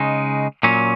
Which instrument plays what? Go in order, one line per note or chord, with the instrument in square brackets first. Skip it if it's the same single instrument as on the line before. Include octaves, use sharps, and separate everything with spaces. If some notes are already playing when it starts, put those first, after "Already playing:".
Already playing: [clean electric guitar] C#3 G#3 D#4
A#2 F#3 C#4